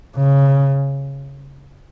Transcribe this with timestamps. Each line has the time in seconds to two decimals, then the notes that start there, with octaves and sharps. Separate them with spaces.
0.16 C#3